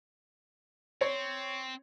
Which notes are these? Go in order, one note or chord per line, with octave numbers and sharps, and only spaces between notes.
C4 C#5